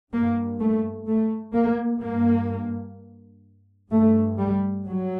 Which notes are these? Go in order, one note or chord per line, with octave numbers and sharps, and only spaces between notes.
G2 A#3
A3
A3
A#3
G2 A#3
G2 A3
G3
F#3